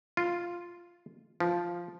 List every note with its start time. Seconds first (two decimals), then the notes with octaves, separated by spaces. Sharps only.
0.17 F4
1.40 F3